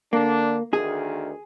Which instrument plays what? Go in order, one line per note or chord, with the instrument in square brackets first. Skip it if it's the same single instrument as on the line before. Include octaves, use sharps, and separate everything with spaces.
[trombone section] D3 D4 [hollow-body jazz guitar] A#3
[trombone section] D2 D#3 [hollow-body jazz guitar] G#4